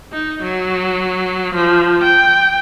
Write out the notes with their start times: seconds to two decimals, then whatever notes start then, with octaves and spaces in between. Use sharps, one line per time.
0.12 D#4
0.43 F#3
1.54 F3
2.03 G5